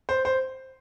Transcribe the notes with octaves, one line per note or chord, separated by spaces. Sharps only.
C5
C5